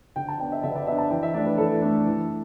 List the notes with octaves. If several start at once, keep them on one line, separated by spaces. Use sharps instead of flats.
D3 G5
A5
B3 D4 G5
E5
D3 E5
B4
D5
B3 D4 E5
A5
E3 G5
E5
A3 D4 D5
B4
E3 A4
A3 D4
E3